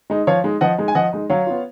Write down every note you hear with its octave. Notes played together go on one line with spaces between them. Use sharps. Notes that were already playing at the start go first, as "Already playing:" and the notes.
G#3 D#4
F3 C#5 F5
G#3 D#4
F3 D#5 F#5
G#3 D#4
G#5
F3 D#5 F#5
G#3 D#4
F#3 C#5 F5
B3 F4